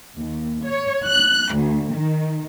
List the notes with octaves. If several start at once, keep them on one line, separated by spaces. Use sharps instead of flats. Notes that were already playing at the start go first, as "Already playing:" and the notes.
D#2
C#5
F#6
D2
D#3